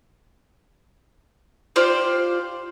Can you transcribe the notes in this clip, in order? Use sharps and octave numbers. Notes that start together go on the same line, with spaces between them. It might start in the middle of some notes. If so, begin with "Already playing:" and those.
F4 G4 C5 D5